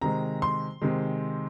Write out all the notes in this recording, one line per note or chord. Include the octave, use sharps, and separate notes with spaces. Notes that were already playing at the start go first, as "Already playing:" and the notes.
C3 D#3 G#3 A#5
C6
C3 D#3 G#3